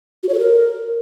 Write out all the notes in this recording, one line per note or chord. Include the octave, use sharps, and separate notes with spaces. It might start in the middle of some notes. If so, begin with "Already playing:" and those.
F#4
C#5
A4
A#4